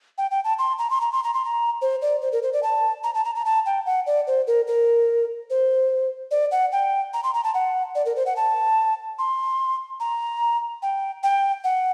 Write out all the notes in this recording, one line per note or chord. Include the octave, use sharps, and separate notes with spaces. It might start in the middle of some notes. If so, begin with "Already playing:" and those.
G5
G5
A5
C6
A#5
C6
A#5
C6
A#5
C6
A#5
C5
D5
C5
A#4
C5
D5
A5
A#5
A5
A#5
A#5
A5
G5
F#5
D5
C5
A#4
A#4
C5
D5
F#5
G5
A#5
C6
A#5
A5
F#5
D5
A#4
C5
F#5
A5
C6
A#5
G5
G5
F#5